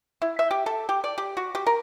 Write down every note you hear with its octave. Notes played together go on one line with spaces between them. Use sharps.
E4
E5
G4
A4
G4
D5
G4
F#4
G4
A#4